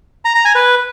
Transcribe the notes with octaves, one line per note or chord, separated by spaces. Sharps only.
A#5
A#5
G#5
B4